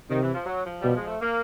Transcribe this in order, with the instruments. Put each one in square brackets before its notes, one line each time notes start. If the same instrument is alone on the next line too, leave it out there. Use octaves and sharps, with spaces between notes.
[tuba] C3 [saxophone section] D#3
[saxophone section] E3
F3
F#3
F3
[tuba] B2 [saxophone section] G3
[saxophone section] G#3
A3
A#3